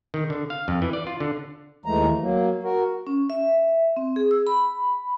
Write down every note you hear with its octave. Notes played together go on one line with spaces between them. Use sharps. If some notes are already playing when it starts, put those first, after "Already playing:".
D#3
D3
F5
F2
E3
D5
F4
D3
D#2 E3 G#3 A3 A#5
F#3 A#3
F#4 A#4
C#4
E5
C4
G#4
E6
B5